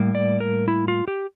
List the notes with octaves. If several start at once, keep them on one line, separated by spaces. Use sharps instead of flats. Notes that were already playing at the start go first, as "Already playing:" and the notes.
Already playing: A2 G3 A#3
D5
A#4
E4
F4
G4